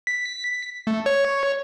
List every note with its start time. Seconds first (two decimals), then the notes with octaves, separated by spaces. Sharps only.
0.07 B6
0.87 A3
1.06 C#5